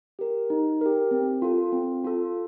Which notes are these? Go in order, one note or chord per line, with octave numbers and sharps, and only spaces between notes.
G4 A#4
D#4
G4 A#4
C4
F4 A4
C4
F4 A4